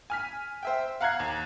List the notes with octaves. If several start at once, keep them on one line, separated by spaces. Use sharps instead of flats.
G#5 F6 B6
C5 E5 G5
F5 F#5 A#5 F#6 G#6 C7
D#2